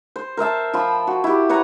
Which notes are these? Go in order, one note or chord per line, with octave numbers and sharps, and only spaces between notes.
C5
A#4 C5 E5 A5
F3 G5 B5
F#4
E4 G4
B4 C#5 F#5 A#5